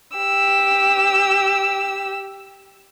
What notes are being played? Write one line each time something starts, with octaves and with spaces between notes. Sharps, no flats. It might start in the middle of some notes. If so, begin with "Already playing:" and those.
G4 E6